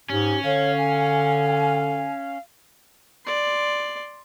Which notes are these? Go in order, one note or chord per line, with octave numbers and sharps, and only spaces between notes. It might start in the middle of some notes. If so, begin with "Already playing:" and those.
G#2 C#4 G4
D3 C#5 F5
G#5
D5 C6